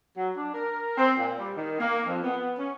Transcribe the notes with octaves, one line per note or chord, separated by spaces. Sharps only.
F#3
D4
A#4
C4
A#2
G3
D#3
A#3
F2
B3
C#4